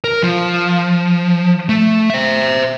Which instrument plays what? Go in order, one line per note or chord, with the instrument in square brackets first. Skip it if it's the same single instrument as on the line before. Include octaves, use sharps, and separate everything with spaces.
[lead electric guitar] A#4
F3
A3
C5 E5